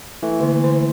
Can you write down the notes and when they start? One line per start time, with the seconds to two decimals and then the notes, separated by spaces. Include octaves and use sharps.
0.23 E3 A3
0.40 D3 A#3
0.64 D3 C5